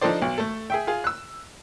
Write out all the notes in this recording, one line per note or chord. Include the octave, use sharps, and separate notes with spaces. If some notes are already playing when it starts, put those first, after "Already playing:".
F3 D4 D#4 A4 C5 D5
B1
A3 A4
G#4 E5 G5
F4 G#4
E6 F#6